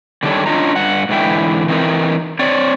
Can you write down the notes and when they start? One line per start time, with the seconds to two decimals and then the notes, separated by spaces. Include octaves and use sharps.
0.23 D3 D#3 G3 D4 A4 C#5
0.46 C#4 D4 F4 D#5 A#5
0.76 G2 F#5
1.09 G#2 D3 E3 E5 G5
1.68 E3 C4 D#4 A#4
2.39 C4 C#5 D5